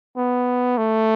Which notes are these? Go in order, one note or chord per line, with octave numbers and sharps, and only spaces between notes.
B3
A3